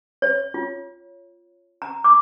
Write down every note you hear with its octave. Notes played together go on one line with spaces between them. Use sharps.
C#5
F4
A#5
D6